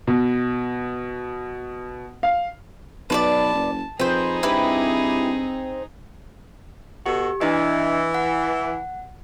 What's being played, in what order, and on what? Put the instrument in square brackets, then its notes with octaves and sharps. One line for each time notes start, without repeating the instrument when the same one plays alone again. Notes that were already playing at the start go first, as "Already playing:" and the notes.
[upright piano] B2
F5
[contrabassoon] B1 [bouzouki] B4 C#5 D5 [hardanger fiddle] A5
[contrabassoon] F#1
[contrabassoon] F2 [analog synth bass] C4 [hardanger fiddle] D#4 G#4 [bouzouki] B4 C5
[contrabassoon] G2 [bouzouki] E4 G4 B4
[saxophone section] B2 F#4 A4 [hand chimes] G4
[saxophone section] E3 [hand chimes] D4 E4 D#5
[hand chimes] F#5